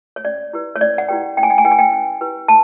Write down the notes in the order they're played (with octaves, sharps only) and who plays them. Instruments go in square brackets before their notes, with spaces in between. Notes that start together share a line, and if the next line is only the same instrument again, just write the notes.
[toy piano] C#5
C#4 D5
E4 G4 B4
C#5
C#4 D5
F#5
E4 G4 B4 G5
C#4 G5
G#5
G5
G#5
E4 G4 B4 G5
G#5
G5
C#4
E4 G4 B4
A5